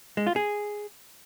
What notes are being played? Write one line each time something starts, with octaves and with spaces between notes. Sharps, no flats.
G#3
F4
G#4